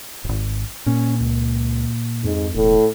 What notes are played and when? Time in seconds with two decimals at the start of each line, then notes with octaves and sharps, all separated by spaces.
0.24 D#1 G#1
0.86 A#2 C#4
1.20 C#2
2.24 F2 G#2
2.55 E1 A2